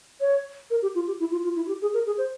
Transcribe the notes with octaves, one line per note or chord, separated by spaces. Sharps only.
C#5
A#4
G4
F4
G4
E4
F4
F4
E4
F4
G4
G#4
A#4
G#4
C5